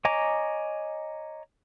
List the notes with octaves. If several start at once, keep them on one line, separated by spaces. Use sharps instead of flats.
C#5 D#5 G#5 A#5 D6